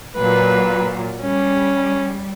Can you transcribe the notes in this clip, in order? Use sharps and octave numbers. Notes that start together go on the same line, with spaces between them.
A#2 F#3 B4
G3 C#4